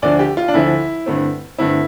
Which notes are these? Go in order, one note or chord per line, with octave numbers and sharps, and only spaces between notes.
D2 D3 F3 D5
G4
F4
D4
D2 D3 F3 E4
G2 D3 A3 C4
G2 D3 A3 C4 E4